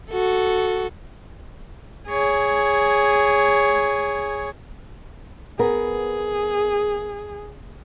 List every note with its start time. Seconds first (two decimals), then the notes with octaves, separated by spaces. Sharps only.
0.10 F#4 A4
2.08 G#4 C#5
5.59 B3 G#4 A#4